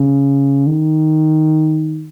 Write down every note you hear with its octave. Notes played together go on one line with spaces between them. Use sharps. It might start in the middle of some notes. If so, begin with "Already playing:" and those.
Already playing: C#3
D#3